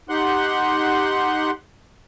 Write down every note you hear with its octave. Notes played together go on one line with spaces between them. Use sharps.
D#4 G4 F#5 C6 F#6